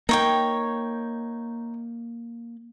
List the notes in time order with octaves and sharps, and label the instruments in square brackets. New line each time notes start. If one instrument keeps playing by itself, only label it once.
[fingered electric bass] A#3 [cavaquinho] D#4 C#5 G5